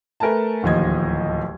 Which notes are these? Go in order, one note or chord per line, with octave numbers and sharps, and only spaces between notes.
A3 A#4 B4 G#5 A5
D1 D#2 F3 D#5 G#6